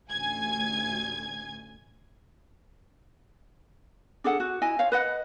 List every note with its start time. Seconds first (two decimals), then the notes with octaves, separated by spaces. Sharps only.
0.10 A1 D2 G#5 G#6
4.24 D4 G#4 A4 F#5
4.40 F#4
4.62 E4 D#5 G#5
4.79 C5 C#5 F5
4.92 B4 D#5 F#5